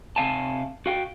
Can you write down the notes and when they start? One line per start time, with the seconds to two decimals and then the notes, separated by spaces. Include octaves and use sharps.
0.16 C3 A#3 F5 G#5 A5
0.86 F#4 F5 G5